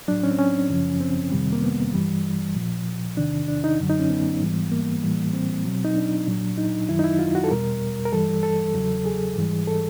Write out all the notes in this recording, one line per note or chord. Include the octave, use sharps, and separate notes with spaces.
A2 F#3 D4
C#4
C4
C#4
F#2 C#3 F3
C4
F2 C3 D#3 G3
A#3
B3
G2 E3 G3
A#2 F3
E2 C3 D#3 D4
D4
D#4
F#2 D3 F#3
D#4
C#4
B3
G#2 E3 G3
A#3
A2 E3 G3
C4
B2 F#3
D#4
D4
A#2 F#3
D#4
F#2 D#3 F#3 E4
D#4
E4
F4
F#4
A4
E2 B2 G3 A#4
A#4
G2 E3 G3 A4
A4
E2 C#3 F#3
G#4
G#2 E3 G3
A4